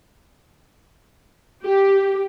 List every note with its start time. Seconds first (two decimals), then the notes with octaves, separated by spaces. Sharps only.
1.64 G4